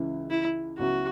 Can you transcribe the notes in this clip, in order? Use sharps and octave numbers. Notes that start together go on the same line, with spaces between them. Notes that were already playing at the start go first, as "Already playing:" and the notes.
Already playing: C#2 C#3 E3 G#3 E4
E4
C#2 C#3 F#3 B3 E4 F#4